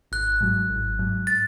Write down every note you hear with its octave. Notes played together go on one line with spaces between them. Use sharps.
G#1 F#6
G#2 F#3
G#1
G#2 F#3
A6